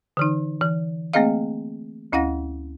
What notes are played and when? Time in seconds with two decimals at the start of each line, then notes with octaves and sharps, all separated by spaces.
0.17 D3 E3 D#4
0.61 E3
1.14 A3 A#3 C4 G#4 D#5 F5
2.13 D2 C#4 E4 F5 F#5 A#6